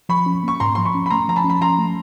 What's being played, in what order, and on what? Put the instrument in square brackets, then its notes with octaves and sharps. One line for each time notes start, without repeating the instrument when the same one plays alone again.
[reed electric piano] F3 [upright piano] B5 C#6
[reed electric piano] C#4
[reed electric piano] A#3 [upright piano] C#6
[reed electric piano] G#2 [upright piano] A#5 C6
[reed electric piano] F3 [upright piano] C6
[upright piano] B5 C#6
[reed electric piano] C#4
[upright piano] B5
[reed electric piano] A3 [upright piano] A#5 C6
[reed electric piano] F3 [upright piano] A#5
[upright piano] A5 B5
[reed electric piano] C#4
[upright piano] B5
[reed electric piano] F3 [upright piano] A#5 C6
[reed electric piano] A3